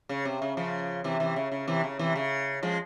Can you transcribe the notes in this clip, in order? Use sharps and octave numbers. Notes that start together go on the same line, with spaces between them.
C#3
C3
C#3
C#3 F3
C3 E3
C3 E3
C#3
C#3
C3 E3
C#3
C3 E3
C#3
F3 G#3